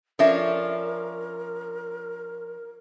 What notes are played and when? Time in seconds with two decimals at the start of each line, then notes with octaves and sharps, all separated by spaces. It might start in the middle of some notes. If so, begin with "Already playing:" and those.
0.19 F3 C#4 D4 A4 A#4 E5